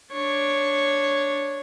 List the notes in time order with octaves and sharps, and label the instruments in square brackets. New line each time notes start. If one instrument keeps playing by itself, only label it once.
[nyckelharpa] D4 C#5